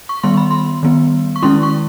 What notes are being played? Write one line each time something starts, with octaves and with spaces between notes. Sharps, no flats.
C#6
D#3 G3 B3 C6
B5
C6
D#3 G3 B3
C#6
D#3 G#3 C#4 E4 C6
C#6